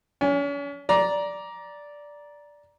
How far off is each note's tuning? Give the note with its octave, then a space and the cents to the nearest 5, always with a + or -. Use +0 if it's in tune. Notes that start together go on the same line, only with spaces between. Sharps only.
C#4 +40 G#5 -10
D5 -5 A#5 +15